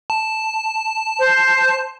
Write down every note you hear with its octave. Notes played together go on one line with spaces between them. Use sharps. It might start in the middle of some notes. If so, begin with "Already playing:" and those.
A5
C5